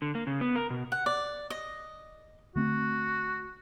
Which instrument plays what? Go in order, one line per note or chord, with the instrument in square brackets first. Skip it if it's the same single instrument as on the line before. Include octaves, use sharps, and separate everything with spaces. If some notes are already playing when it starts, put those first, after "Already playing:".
[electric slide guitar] D3
A#3
C#3
B3
A#4
B2
[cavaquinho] F#5
D5
D#5
[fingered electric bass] D3 A3 C4 [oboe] F#4